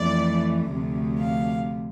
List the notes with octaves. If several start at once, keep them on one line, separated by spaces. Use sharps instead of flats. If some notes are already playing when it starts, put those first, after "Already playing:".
Already playing: F2 E3 A3 D5
D2 C3 F3 A3
F5